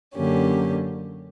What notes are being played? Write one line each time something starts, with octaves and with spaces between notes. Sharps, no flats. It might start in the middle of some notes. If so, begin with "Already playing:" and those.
F#2 D3 A#3 C#4 G4